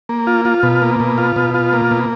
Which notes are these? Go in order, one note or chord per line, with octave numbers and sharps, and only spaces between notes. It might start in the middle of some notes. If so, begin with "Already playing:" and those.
A#3
F4
F4
B2
A#3
B2
F4
B2
F4
A#3
B2